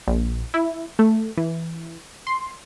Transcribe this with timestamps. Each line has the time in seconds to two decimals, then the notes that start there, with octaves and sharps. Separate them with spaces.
0.08 A#1
0.54 E4
0.99 A3
1.37 E3
2.27 C6